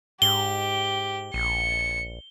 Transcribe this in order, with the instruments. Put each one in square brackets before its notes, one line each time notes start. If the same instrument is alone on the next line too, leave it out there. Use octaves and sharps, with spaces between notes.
[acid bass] G#2 [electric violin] G4 [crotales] G7
[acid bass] A#1 [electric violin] C#7